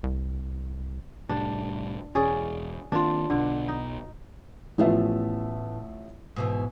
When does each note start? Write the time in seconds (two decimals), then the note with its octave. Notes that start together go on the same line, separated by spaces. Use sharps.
0.03 C2
1.29 C2 A2 G3 D4
2.15 E1 C#4 G#4 D5
2.92 D#3 A#3 C4 D4 F4
3.30 B1 B2 D3
3.68 D#4
4.78 A1 E2 A2 F3 B3 E5
6.36 G#2 B2 E3